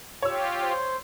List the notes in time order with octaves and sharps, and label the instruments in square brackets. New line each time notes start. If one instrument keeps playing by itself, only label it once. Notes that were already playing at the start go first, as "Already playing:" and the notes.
[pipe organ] F4 G4 [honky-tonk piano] C#5 E6
[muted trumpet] C5